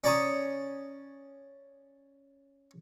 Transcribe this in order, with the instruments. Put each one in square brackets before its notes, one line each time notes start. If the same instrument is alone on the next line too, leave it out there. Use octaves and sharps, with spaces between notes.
[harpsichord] C#4 D5 A5 A#5 C#6 D#6